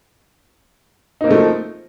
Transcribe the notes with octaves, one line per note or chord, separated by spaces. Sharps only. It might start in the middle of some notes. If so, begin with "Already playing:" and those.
F3 A3 A#3 C4 D#4